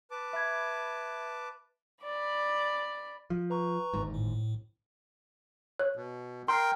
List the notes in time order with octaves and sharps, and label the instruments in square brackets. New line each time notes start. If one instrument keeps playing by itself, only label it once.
[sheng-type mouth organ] B4 A5 D6
[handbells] E5 B5 G#6
[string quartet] D5 B5
[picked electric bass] F3
[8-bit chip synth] B4 A#5 C#6
[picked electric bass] G1 D#2 G#2
[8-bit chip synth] A2
[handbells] C#5 F#6
[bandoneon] B2
[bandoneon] A#4 G5 [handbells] C6 F6 C7